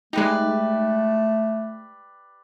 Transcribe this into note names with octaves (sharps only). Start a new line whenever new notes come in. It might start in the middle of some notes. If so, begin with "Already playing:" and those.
G#3 A3 D#4 G4 B4 D5